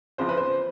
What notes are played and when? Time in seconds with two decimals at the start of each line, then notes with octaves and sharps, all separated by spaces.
0.18 F#1 E2 C#3 F3 C5
0.29 B4
0.37 C5